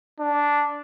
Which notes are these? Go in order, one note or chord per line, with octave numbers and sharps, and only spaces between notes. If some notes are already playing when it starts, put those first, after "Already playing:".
D4